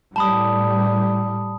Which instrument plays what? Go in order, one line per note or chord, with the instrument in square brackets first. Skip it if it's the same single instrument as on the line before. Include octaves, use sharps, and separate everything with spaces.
[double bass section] A2 G3 [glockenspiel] A5 B5 D#6